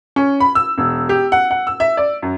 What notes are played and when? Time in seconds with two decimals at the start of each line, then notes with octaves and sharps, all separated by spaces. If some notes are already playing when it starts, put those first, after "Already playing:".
0.16 C#4
0.40 B5
0.55 E6
0.78 E1
1.09 G4
1.32 F#5
1.51 F#5
1.67 E6
1.80 E5
1.97 D5
2.22 F#2